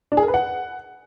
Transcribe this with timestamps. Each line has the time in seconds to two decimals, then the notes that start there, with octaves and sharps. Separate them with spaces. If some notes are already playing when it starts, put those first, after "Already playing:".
0.12 D4
0.17 G#4
0.23 A#4
0.28 B4
0.34 F#5